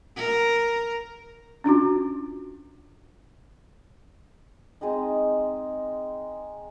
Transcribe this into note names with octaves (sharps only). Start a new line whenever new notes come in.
A#4
C#4 D4 F4 F#4
G#3 C4 D#4